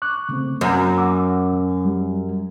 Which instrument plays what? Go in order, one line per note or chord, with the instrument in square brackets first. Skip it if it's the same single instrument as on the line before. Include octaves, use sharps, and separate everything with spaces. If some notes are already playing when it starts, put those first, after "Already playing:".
[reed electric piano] C#6 D6 F#6
C#3 A3 C4
[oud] F#2 [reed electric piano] A#3 A#5
[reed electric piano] F#5 D6 E6
G3